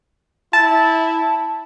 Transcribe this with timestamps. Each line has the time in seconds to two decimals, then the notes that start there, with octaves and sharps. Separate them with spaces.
0.53 E4 A5